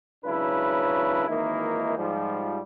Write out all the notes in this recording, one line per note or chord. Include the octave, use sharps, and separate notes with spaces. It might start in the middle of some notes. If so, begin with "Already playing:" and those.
G#1 C#3 F#3 D4 E4 B4
G#1 D#3 E3 A#3 D#4 E4
G#2 F3 G3